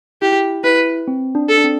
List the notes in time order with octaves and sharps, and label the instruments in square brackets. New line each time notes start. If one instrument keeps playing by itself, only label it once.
[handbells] E4 [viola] G4
[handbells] E4 [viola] B4
[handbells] C4
D4
[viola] A4
[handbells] D4
C4